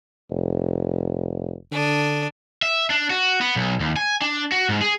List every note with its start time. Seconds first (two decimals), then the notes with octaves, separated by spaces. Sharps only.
0.30 F1
1.72 D3 D4 D#6
2.62 E5
2.90 D4
3.10 F#4
3.41 B3
3.56 B1
3.80 D#2
3.96 G#5
4.22 D4
4.52 F#4
4.69 G#2
4.81 G#4